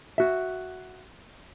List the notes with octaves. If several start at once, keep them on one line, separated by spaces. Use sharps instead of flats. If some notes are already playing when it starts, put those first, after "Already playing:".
F#4 E5